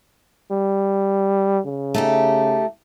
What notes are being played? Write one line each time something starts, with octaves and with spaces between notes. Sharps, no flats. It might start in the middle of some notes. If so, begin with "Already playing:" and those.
G3
C#3
A3 D#4 G4